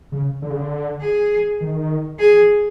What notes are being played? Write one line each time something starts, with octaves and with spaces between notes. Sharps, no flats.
C#3
D3
C#3
D3
G#4
D#3
G#4